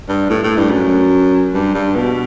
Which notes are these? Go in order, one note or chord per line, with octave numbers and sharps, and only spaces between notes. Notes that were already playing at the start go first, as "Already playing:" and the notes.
G2
A2
A2
G2
F#2
G2
G2
B2